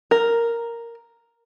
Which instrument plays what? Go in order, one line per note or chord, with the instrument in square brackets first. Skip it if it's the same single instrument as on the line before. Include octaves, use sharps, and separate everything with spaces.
[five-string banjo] A#4